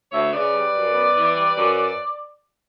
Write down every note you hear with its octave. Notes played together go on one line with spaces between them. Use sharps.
D2 C#5 E5
C#3 B4 D5
G3
F#2
B3
E3
G3
F#2